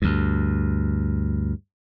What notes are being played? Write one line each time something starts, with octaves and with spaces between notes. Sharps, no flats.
D2 G2